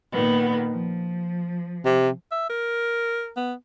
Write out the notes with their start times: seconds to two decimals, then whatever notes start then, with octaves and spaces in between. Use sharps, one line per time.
0.12 A#2 D#3 B3
0.69 F3
1.85 C3
2.31 E5
2.50 A#4
3.37 B3